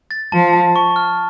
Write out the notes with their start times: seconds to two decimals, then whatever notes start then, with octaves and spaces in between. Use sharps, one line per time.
0.11 A6
0.32 F3 A5
0.53 A5
0.76 C#6
0.96 F6